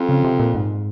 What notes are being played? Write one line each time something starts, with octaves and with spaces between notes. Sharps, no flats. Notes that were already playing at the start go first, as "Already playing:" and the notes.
Already playing: F2
C#3
C3
A#2
G#2